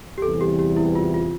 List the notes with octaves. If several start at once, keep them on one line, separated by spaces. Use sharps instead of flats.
G4
E2 C3 E3 G3 A4
G4
G4
E4
F4
F4